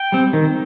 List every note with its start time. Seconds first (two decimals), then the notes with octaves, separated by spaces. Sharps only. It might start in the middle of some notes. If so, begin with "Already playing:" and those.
Already playing: G5
0.12 G3 C4
0.33 D#3